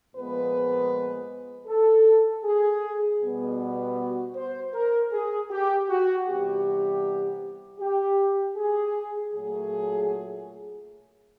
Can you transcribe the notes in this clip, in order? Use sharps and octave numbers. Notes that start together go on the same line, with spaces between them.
A#2 F3 G#3 B3 B4
A4
G#4
B2 G3 B3
F#4
C5
A#4
G#4
G4
F#4
C3 E3 G3 B3 G4
G4
G#4
A#2 F#3 A3 G#4